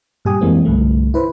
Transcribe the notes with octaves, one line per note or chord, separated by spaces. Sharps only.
G2 A#2 G4 G#5 D#6
F2 E3 G#3 A#3 C4
C2 G2 D3 A3
E4 B4 C5